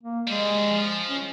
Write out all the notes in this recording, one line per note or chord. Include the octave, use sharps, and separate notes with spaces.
A#3
G3 G#3 G#4
F3
C#4